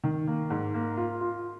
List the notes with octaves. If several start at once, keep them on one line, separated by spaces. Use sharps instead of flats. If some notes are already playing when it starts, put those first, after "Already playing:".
D#3
A#3
G#2
A#3
F4
F4